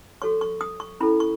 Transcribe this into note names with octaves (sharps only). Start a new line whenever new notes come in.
F#4 A4 C#5 C#6
C#6
D#6
C#6
C#4 E4 A4 B5
C#6